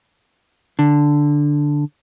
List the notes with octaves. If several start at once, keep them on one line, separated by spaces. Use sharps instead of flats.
D3